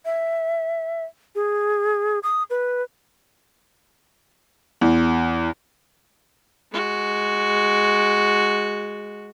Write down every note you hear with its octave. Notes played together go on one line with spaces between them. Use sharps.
E5
G#4
D#6
B4
E2
G#3 F#4